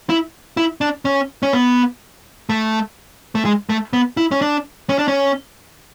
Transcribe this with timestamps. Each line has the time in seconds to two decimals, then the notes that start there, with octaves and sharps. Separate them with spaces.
0.09 E4
0.57 E4
0.81 D4
1.05 C#4
1.43 C#4
1.53 B3
2.49 A3
3.35 A3
3.45 G#3
3.69 A3
3.93 B3
4.17 E4
4.31 C#4
4.41 D4
4.89 C#4
4.98 D4
5.08 C#4